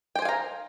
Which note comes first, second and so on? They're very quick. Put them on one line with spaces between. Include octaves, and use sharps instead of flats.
G5 C5 G#5 F5 A#5